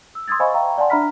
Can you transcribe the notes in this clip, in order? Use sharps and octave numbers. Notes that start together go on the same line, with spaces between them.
E6
C6 D#6 E6 G#6 A6
C5 D#5 F5 G#5 B5 C#6
E5 F5 G5 A#5 C#6
D5 F#5 G#5 A5 C6
D4 E5 A#5 B5 F6 B6